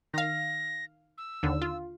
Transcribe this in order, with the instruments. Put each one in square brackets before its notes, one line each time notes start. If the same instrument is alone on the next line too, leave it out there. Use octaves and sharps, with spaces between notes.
[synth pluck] D#3 F5 [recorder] A#6
[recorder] E6
[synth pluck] D#2 D3
F4